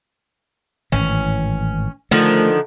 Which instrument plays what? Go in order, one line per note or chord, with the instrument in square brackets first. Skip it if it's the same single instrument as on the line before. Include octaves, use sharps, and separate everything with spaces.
[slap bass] G#1 A2 E3 [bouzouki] C#4
[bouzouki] D3 D#3 F3 [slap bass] A3